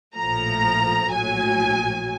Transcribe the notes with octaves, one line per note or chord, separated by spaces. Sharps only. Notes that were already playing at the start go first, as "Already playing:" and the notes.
A#1 A2 F3 A3 A#5
A#1 A2 F#3 G#5